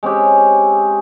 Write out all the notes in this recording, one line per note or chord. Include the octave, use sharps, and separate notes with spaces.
G#3 C4 C#4 G4